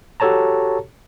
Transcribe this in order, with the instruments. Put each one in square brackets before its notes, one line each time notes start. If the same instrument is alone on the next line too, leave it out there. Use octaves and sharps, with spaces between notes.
[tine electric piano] F#4 G4 A4 C#5 A5 A#5